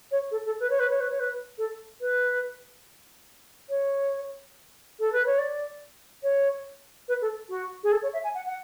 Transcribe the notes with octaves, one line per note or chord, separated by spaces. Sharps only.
C#5
A4
A4
B4
C#5
B4
C#5
B4
C#5
B4
A4
B4
C#5
A4
B4
C#5
D5
C#5
B4
A4
F#4
G#4
A4
C#5
E5
G#5
F#5
F#5